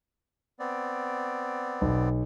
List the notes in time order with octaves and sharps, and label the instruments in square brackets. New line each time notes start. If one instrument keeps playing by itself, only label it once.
[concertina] B3 C4 D5
[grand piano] B1